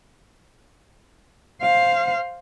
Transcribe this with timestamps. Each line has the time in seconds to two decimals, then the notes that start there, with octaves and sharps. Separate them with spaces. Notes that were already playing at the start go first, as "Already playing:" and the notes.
1.62 C5 F5